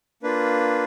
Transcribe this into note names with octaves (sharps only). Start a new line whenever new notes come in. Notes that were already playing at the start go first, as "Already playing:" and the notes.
A#3 D4 F4 B4